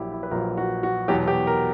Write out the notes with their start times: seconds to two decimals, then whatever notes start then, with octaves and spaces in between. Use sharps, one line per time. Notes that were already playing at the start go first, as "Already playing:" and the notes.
Already playing: A#1 A#2 F#3 E4 G4
0.12 E4
0.23 B4
0.31 A#1 A#2 F#3 A#4
0.57 F#4
0.83 F#4
1.08 E2 B2 F#3 G4
1.28 G4
1.47 A#4